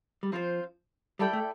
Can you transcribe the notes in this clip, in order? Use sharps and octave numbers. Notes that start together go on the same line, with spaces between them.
G3
F3 C4 F4 C5
G3 E4 A4 D5 G5
A3